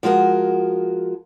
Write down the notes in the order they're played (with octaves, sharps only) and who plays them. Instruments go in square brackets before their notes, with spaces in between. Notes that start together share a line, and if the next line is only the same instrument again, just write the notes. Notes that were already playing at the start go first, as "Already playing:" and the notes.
[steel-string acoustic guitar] F3 G#3 F#4 A#4